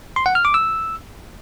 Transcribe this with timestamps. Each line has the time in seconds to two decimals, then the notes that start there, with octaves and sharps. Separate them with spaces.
0.16 C6
0.26 F#5
0.35 F6
0.45 D6
0.54 E6